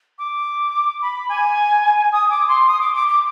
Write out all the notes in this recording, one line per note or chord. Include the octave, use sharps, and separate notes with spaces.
D6
B5
G#5
D#6
D6
C6
D#6
D6
D6
D6